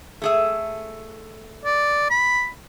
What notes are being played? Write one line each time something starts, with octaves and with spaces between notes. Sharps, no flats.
A3 G#4 E5
D5
B5